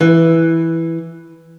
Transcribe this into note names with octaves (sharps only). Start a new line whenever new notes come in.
E3